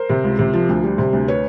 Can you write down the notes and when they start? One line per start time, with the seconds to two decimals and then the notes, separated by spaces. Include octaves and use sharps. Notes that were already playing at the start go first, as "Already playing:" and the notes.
Already playing: A#4 C5
0.09 C3
0.24 C#2
0.39 C3
0.53 F3
0.69 D2
0.84 G3
0.98 C3
1.13 D2
1.28 B4 C#5